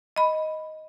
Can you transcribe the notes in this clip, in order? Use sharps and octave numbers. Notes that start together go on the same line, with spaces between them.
D#5 B5